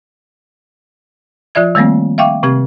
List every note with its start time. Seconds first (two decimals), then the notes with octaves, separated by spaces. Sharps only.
1.55 F3 F4 D5 E5 G#6
1.75 D#3 G3 A3 A#3 C4
2.18 E5 F5 G5 C#6 D6
2.43 C3 C4 G4 G#6